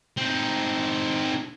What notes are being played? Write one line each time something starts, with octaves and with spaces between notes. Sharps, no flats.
C4 D#4